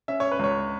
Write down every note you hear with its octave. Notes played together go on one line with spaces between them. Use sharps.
C#4 E5
C#5
B4
C#2 C#5